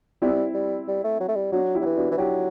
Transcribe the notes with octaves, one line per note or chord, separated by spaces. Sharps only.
G3 C4 E4
G3
G3
A3
F#3
A3
G3
F#3 D4 F#4
E4 G4
F#3
E3
D4 F#4
E3
F#3 E4 G4